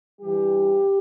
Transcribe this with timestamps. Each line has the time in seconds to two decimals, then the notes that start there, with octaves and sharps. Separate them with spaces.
0.21 G2 E3 G3 G4